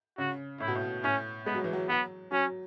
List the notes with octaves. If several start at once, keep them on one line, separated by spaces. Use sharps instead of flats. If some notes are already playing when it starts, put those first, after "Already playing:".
C#3 F#4
A2 E4
B2
A2
A2 C#4
G#3 B3
F#3
E3
F#3
F#3 B3
F#3 C#4